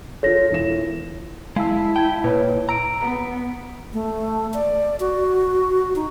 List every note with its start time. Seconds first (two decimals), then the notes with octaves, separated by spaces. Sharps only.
0.23 F4 A4 C#5 A#6
0.51 E1 E4 E7
1.56 G#3 E4 F5 A5 E6
1.96 G5 A5 G#6
2.24 A#2 B4 C#5
2.69 A#5 E6 D7
3.00 B3
3.93 A3
4.54 D5
5.00 F#4
5.96 D#4